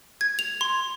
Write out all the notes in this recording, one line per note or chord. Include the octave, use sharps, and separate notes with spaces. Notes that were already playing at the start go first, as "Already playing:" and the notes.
G#6
F7
C6